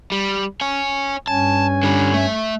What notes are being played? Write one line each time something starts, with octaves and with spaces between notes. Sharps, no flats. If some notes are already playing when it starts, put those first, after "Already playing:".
G3
C#5 G#5
G2 C#4 G#5 A5
D3 G3
A3 E5